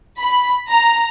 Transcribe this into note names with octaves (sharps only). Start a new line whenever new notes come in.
B5
A#5